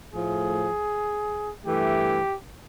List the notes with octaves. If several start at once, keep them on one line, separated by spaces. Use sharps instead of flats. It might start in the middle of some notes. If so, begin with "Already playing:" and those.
A2 F3 A3 G#4
G2 E3 A3 G4